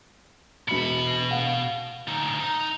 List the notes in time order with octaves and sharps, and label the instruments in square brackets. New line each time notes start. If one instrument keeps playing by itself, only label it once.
[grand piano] E1 C#7 [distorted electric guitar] B2 B5
[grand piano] F5 F#5
[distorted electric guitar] D2 D#4
D#4